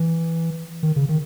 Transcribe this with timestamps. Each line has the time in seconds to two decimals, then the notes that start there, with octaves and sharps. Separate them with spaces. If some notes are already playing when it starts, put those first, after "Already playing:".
Already playing: E3
0.83 D#3
0.96 C#3
1.09 D#3